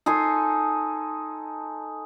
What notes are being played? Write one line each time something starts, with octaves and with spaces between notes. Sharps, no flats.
D#4 A4 G#5 C6